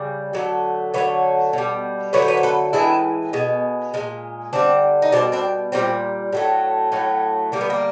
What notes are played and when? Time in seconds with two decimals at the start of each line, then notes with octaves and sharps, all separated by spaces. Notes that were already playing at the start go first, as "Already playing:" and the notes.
Already playing: C#3 G3
0.33 D3 F#3 A3
0.94 D3 F#3 A3 B4 C#5
1.53 B2 G3
2.13 D3 F#3 A3 B4 C#5
2.22 C5
2.28 B4 C#5
2.37 C5
2.43 A4 B4
2.73 A2 E3 G#3 D4 E4
3.33 B2 G#3
3.94 A#2 F3 G#3
4.53 D3 G3 C4 D4
5.02 D#4
5.12 B2 G3 C4 D4
5.32 C4 D4
5.72 A#2 G3 A#3 C4
6.33 A2 F#3 A3
6.92 A2 F#3 A3
7.52 D3 G3 A#3
7.61 B3
7.70 A#3